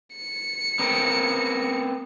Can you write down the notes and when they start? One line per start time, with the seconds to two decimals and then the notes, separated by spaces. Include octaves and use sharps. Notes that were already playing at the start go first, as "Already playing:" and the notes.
0.16 C#7
0.79 B3 C4 A#4